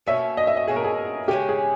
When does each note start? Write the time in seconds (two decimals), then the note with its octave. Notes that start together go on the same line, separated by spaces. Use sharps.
0.07 B2 A#3 C#4 E5
0.37 D#5
0.47 E5
0.57 D#5
0.68 B2 A#3 C#4 G#4
0.76 A#4
0.84 G#4
1.28 C#3 G#3 C#4 G4
1.49 G#4